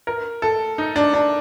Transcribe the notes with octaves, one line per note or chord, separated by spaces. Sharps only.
A#4
A4
D#4
D4
D4